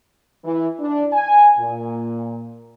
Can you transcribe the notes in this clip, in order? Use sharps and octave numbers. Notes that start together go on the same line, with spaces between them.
E3
D4
G#5
A#2